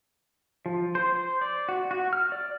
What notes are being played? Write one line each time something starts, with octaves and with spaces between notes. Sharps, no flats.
F3
C5
C5
D5
F#4
F#4
F6
D5